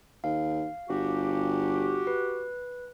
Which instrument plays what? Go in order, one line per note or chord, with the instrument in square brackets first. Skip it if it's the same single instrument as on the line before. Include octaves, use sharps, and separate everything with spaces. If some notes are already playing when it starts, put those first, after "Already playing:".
[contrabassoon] D#2 [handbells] F5
[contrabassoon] G1 [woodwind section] F#4 G4
[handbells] B4